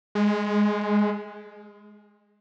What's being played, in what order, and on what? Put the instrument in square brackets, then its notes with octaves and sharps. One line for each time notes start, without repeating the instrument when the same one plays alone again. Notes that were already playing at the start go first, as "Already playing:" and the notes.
[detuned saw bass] G#3